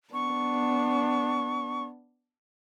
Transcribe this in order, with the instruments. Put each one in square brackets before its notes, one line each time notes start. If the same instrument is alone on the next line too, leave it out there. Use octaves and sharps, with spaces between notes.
[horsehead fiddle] B3 D4 [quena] C#6